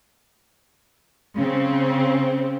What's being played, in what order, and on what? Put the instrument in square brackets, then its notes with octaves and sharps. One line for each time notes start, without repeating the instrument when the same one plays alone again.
[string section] C#3 C4